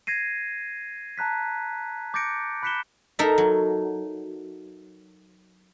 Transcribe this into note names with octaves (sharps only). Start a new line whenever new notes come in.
G#6 A#6 C7 D#7
A5 A#5 F#6 B6
D6 G6 A6 A#6 C#7 D7
B5 F#6 B6 C#7 E7 G7
D#4 A4 A#4 E5
F#3